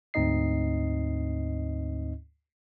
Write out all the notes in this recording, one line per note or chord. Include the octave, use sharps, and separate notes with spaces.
D2 G#2 C4 D#4 D#5 C7